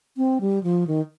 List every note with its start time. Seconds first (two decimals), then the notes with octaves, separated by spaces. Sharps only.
0.17 C4
0.41 G3
0.63 F3
0.87 D#3